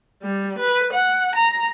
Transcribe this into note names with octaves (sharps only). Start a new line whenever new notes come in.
G3
B4
F#5
A#5